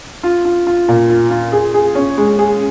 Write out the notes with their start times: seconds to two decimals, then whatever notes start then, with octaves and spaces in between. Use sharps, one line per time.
0.23 F4
0.45 F4
0.67 F4
0.88 A#2
1.09 F4
1.31 F4
1.52 G#4
1.74 G#4
1.95 C#4
2.17 G#3
2.39 G#4